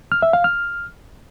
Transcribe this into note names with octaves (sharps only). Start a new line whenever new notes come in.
F6
E5
F5
F6